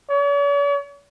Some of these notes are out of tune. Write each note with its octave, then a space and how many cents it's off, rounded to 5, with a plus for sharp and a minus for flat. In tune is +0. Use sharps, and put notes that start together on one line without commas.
C#5 +45